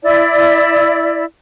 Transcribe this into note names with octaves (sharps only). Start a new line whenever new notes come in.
E4 D5